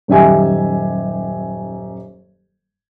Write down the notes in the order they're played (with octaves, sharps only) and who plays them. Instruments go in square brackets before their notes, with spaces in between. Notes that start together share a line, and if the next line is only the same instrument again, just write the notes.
[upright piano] D#1 F#2 D#4 G4 E5 G#5